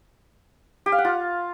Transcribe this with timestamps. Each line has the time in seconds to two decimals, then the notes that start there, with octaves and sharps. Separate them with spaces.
0.86 G4
0.92 F5
0.98 F#5
1.05 F4